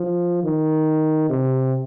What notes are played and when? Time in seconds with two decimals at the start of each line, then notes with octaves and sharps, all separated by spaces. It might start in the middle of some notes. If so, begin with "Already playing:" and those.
Already playing: F3
0.43 D#3
1.30 C3